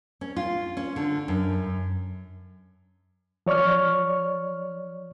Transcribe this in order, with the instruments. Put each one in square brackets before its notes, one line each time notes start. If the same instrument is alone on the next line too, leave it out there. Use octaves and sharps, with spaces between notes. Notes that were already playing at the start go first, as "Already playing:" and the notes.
[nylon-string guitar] C#4
F4
C#4
D3
F#2
[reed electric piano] F3 C#5 D5 C#6 F6